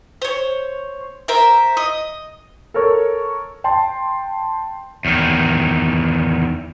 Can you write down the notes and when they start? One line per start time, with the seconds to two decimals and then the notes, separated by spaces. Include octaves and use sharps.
0.22 C5 C#5
1.28 A#4 C5 E5
1.77 D#5
2.74 A4 A#4 C#5
3.64 G5 A5 C6
5.05 E2 D#3